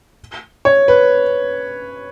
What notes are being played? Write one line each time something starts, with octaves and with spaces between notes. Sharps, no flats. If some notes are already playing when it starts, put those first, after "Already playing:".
C#5
B4